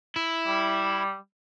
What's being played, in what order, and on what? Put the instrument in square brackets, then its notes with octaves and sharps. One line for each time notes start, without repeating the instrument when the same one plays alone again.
[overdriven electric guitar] E4
[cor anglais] G3